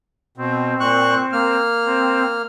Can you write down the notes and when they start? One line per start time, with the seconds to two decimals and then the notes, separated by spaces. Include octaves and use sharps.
0.38 B2 C4
0.80 A#2 C#6 F#6
1.33 A#3 F6
1.86 C4